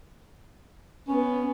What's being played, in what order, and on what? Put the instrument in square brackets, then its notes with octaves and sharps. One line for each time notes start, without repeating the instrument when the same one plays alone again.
[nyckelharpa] B3 [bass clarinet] C#4